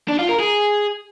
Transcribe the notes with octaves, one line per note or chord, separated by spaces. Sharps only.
D4
F4
A#4
G#4